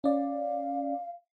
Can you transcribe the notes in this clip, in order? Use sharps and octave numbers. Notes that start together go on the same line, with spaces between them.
C#4 D5 F5